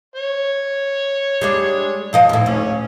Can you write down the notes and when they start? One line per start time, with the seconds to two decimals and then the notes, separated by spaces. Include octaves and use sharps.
0.16 C#5
1.41 G3 G#3 D4
2.13 G#2 F3 D#5
2.29 D#2 A2
2.46 D2 C#4